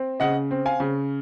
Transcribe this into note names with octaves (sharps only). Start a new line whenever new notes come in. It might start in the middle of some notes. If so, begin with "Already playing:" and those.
Already playing: C4
C#3 D#5 F#5
C4
F5 G#5
C#3